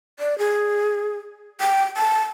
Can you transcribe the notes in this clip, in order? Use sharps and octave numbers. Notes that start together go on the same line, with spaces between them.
D5
G#4
G5
A5